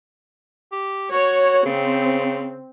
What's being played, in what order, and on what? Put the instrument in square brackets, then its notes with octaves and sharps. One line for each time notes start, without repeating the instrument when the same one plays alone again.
[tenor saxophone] G4
[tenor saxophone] F#4 [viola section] C#5
[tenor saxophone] C#3 [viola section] C4